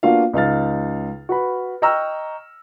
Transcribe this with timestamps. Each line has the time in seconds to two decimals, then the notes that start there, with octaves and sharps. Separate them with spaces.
0.03 A#3 B3 D4 F4 F#4 F5
0.34 C#2 D#4 F5 F6 A6
1.29 F#4 B4 B5
1.82 D#5 G5 A#5 C#6 E6 F6